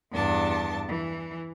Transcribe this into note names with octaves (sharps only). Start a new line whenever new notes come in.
E2 G2 D4 A5
E3